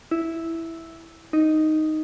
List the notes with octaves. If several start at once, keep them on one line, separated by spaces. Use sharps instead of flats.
E4
D#4